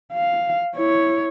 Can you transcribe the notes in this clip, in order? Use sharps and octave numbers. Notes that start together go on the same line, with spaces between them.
F5
E4 C#5